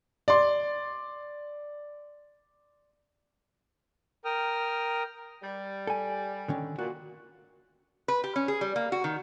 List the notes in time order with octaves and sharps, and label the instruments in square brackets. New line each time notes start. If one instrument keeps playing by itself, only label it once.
[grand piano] D5 C6
[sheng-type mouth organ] A#4 G5 D#6 F6
[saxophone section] G3
[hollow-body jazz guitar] A4 G#5
D3 D#3 C#4
[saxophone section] A#2 [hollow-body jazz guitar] F#4
[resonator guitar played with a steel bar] B4
G4
C#4
G#4
G3
A#3
F#4
D#3